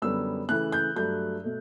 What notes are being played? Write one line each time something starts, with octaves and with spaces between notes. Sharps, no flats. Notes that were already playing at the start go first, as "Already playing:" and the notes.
F#2 D3 G3 B3 E6
C#3 E3 A3 F#6
G6
G2 F#3 A3 G6
B2 A3